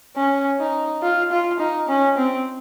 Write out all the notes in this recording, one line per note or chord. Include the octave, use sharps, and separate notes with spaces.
C#4
D#4
F4
F4
D#4
C#4
C4